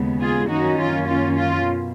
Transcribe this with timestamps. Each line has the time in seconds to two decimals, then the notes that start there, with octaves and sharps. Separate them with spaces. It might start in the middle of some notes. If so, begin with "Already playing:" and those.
Already playing: D#2 C#3 G#3 B3
0.21 F4 G#4
0.49 F#2 D#3 A#3 C#4 D#4 F#4
0.78 F4
1.07 F4
1.36 F4
1.64 B2